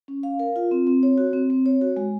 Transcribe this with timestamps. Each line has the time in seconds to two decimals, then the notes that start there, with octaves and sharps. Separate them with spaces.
0.08 C#4
0.23 F5
0.39 A#4
0.56 F4
0.71 C4
0.87 C4
1.03 C#5
1.18 F#4
1.33 C4
1.50 C4
1.66 C#5
1.81 F#4
1.97 G#3